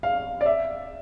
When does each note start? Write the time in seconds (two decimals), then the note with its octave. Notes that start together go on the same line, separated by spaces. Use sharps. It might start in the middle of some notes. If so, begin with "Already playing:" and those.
0.03 F5
0.41 D5
0.46 E5